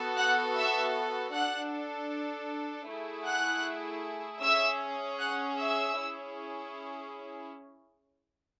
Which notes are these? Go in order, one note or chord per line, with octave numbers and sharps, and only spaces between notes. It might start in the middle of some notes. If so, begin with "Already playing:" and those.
Already playing: B3 F#4 A4
F#5 F#6
E5 E6
D4 A4 F#5 F#6
A3 E4 G#4
F#5 F#6
C#4 G#4 E5 E6
F#5 F#6
E5 E6
C#4 E4 G#4